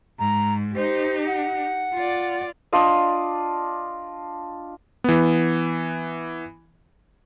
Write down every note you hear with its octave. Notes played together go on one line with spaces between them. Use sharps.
G#2 A#5
D#4 G4 C5
F#5
F4 D5
D4 F4 D5 D#5
E3 B3